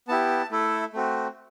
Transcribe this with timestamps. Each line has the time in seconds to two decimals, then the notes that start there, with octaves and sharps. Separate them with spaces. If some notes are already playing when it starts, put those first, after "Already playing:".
0.08 B3 E4 G4 A5
0.51 A3 E4 A4
0.93 A3 C4 F#4